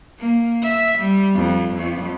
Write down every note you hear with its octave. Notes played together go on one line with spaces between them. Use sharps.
A#3
E5
G3
F2
F2